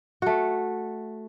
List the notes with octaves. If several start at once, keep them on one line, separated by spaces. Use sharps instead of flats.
A3 F#4